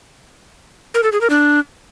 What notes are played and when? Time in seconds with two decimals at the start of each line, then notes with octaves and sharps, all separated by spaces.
0.94 A#4
1.03 A4
1.12 G#4
1.21 A#4
1.30 D4